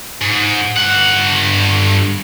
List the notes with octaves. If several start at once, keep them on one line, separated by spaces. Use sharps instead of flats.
G#2
G2 F#5